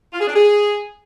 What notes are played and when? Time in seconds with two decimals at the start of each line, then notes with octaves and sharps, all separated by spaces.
0.13 F4
0.20 G#4
0.27 D4
0.34 G#4